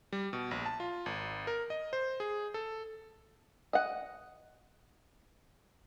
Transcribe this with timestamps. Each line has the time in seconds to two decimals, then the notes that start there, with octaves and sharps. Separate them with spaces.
0.12 G3
0.33 B2
0.51 A#1
0.66 A5
0.80 F4
1.06 G#1
1.47 A#4
1.70 D#5
1.93 C5
2.20 G#4
2.54 A4
3.73 D#5 F#5